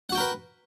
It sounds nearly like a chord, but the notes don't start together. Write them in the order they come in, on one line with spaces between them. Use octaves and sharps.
F#5 F#4 G5 A#4 B4